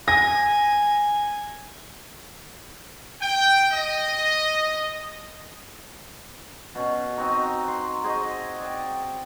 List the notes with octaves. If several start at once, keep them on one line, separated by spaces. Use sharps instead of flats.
G#5 A#6
G5
D#5
B2 C#4
C4 D#4 F#4 A#5
A#5 C6
F#4 G#4 C5 D#5
D5 G5